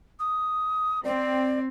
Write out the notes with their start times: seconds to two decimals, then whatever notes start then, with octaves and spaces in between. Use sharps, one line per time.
0.19 D#6
1.04 C4 D5